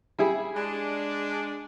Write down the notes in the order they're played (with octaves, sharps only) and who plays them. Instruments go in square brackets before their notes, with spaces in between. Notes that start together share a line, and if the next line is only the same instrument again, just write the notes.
[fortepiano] G3 E4 G#4
[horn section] G#3 D4